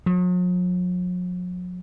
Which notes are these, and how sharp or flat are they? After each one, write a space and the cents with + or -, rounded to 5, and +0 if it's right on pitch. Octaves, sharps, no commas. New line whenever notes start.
F#3 -45